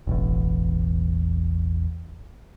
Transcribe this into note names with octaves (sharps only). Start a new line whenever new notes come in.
E1 A1 E2